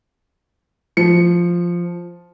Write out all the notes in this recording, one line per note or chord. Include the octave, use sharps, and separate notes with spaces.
F3 C#7